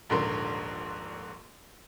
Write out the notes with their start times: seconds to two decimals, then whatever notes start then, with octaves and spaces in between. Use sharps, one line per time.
0.09 D#1 A#1 G#2 D3 A#4 C6